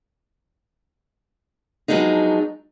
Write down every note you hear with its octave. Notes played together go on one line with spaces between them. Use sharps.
F3 F#3 G#3 B3 D4 D#4